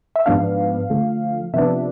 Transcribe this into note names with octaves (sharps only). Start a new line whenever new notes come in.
E5
G#2 F3 B3 D4 F5
D3 F3 A3
C3 F3 B3 D4 E5